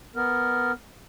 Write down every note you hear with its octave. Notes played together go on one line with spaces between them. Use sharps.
B3 A#4